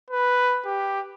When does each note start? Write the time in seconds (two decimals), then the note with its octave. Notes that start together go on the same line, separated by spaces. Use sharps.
0.10 B4
0.66 G4